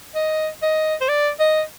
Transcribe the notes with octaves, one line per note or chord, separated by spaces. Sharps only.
D#5
D#5
C5
D5
D#5